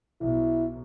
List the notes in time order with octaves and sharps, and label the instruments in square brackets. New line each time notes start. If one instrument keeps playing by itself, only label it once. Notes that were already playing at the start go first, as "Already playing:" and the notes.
[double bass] B1 [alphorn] E4